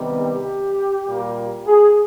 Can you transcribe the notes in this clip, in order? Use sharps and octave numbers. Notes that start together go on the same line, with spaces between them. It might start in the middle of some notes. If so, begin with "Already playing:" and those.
Already playing: C3 D#3 G3 B3
G4
A#2 G3 A#3
G#4